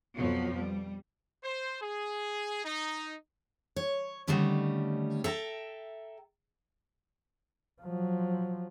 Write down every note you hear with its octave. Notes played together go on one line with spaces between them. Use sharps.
F2 B2 F3 F#3 B3
G3
C5
G#4
D#4
C#5
D3 D#3 G3 A3 C#4
A4 E5 G5 A#5
F3 F#3